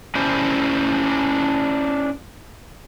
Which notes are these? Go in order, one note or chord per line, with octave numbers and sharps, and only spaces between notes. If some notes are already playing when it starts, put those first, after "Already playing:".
C#4 D4 E4 G4 C5